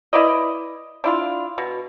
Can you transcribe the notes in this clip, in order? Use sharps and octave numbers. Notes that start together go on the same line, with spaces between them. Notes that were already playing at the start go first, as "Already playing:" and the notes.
E4 B4 D5 D#5
D4 E4 F4
B2